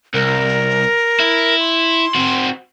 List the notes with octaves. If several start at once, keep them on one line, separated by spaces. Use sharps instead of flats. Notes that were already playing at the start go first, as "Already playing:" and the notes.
C2 A#4
E4
C6
C4 F#4